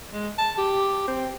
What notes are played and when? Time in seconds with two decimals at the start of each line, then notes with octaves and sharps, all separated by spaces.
0.13 G#3
0.38 A5
0.58 G4
1.08 C4